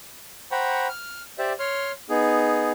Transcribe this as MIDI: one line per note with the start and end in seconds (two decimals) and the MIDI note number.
0.52 0.88 72
0.52 0.88 78
0.52 0.88 79
0.52 0.88 82
0.52 0.88 83
0.52 0.88 85
0.89 1.22 89
1.39 1.53 67
1.39 1.53 72
1.39 1.53 74
1.39 1.53 76
1.59 1.92 73
1.59 1.92 84
1.59 1.92 89
2.09 2.72 59
2.09 2.72 63
2.09 2.72 68